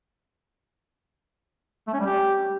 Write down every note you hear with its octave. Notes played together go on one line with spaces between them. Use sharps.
A3
C#4
G3
G4